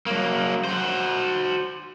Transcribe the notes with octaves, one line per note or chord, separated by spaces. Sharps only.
F#3 A#3
F#4 C5